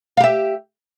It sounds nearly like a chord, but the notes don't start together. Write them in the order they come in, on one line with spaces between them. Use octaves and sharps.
F5 G4 E5